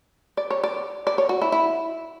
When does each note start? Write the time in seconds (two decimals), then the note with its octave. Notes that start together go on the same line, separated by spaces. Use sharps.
0.37 D5
0.51 C#5
0.64 D5
1.07 D5
1.18 C#5
1.29 F#4
1.42 E4
1.52 E4